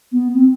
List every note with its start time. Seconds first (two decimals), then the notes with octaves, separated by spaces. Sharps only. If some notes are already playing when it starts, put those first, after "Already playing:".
0.12 B3
0.34 C4